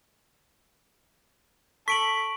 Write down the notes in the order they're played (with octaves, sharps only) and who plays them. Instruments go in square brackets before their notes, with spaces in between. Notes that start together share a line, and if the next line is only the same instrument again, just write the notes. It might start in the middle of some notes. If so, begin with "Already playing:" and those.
[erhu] A4 [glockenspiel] C#6 D7 F#7 [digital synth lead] B6